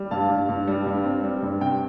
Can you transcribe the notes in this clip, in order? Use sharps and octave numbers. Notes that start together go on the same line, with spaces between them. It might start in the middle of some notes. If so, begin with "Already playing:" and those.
Already playing: G3
G2 F5 A5
G2
G2
G3
G2
C4
G3
G2
C3 G5